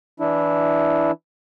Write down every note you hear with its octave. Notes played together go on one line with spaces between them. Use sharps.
E3 D4 E4